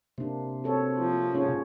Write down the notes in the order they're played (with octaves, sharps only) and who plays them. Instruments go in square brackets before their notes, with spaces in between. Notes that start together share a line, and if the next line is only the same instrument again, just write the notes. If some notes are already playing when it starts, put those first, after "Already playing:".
[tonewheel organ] C3 [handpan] A#3 D4
[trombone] C4 [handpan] F#4 A4 C#5
[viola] F3 A#3
[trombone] G#2 [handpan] C#4 C#5